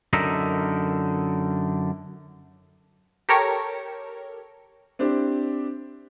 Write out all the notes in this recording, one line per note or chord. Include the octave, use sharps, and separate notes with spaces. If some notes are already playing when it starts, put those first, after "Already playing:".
F#2 D3 D#4 A#4 E5
G4 A4 A#4 C#5
C4 D4 E4 G4